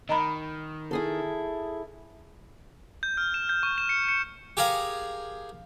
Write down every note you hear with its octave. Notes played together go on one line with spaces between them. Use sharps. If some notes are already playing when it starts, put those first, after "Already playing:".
D#3 D#5 A#5 B5
E4 G#4 A4
G6
F6
E7
G6
C#6
E7
C#7
C#7
G4 G#4 A#4 F5